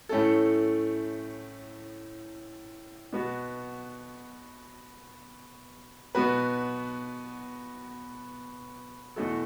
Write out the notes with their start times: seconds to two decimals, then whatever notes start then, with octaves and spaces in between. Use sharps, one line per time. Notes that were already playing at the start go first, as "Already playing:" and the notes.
0.09 A2 A3 C#4 A4
3.13 B2 B3 F#4
6.15 B2 B3 F#4 B4
9.16 E2 B2 A3 F#4 A4